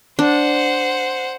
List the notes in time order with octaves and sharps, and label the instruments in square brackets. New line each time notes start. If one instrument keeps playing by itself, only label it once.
[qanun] D4 [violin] C5 F#5